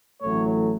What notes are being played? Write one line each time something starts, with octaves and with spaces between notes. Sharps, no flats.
A1 A2 F#3 A3 C#5